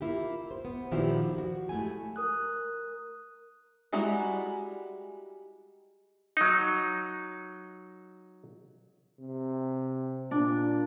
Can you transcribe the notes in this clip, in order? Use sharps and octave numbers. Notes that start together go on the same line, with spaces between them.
A#3 E4 F4 G4
C5
B3
A#2 D#3 F3 E4 F#4 G4
F#4
G#3 A3 E4 G4 G#5
A#4 D#6 F#6
G3 G#3 E4 F#4 A#5
F#3 D#4
C3
A#2 D4